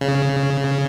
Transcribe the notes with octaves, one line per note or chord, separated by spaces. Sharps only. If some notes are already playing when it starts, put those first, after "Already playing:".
C#3